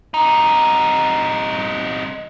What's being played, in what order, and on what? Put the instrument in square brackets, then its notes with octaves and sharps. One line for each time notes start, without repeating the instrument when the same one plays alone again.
[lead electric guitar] C3 D#4